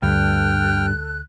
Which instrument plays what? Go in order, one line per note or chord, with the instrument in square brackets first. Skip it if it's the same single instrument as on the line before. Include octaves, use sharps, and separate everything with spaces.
[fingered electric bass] D2 [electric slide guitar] G2 [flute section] A4 F#6 [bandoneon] G5 F6